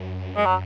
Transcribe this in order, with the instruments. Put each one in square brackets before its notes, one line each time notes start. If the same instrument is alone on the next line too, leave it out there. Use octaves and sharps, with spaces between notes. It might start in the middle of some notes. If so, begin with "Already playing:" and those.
Already playing: [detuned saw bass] F#2
[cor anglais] G#3
F#3